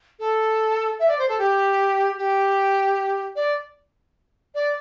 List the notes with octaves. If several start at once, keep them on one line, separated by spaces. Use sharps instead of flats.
A4
E5
D5
C5
A4
G4
G4
D5
D5